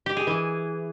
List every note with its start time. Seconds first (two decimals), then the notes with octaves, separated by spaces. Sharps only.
0.06 G4
0.17 G#4
0.27 E3